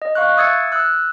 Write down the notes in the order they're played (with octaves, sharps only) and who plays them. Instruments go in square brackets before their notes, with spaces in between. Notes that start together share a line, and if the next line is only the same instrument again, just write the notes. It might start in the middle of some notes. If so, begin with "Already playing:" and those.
[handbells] D#5
F5 C#6 F#6
E5 D#6 E6 G#6 A6 C#7
E6 F#6